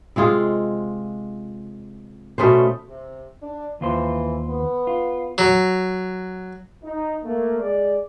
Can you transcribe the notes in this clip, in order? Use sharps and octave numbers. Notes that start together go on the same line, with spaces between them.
C3 G#3 F4 G#4
B2 A3 C#4 C5
C3
D4
D#2 E3 F4 C5
B3
F4
F#3
D#4
A3 A#3
G#3 D5